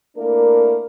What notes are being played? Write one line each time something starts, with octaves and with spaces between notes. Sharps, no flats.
A3 A#3 D4 E4 A#4